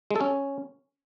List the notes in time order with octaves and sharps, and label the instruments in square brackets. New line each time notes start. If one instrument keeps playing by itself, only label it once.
[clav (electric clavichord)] G#3
A4
C#4